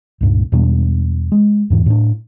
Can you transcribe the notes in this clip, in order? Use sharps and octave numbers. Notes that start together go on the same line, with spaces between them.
C#2 G2 A#2
E2 B2 G3 D4
G#3
E2 G#2 E3
A2 D4